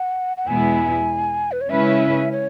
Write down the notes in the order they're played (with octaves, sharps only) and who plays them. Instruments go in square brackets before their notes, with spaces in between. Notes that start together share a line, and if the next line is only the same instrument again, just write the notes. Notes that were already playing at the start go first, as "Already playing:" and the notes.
Already playing: [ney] F#5
F#5
[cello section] E2 B2 G#3 B3 E4 [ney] G#5
[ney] B4
C#5
[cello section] C#3 G#3 C#4 E4 B4 [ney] E5
[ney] C#5